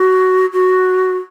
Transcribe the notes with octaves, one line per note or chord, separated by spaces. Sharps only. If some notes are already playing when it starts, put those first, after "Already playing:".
Already playing: F#4
F#4